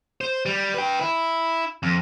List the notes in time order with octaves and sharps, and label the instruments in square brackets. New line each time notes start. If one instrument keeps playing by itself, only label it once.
[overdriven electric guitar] C5
G3
B4 G5
E4
F2